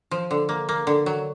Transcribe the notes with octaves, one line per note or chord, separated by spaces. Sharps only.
F3
D3
A#3
A#3
D3
F#3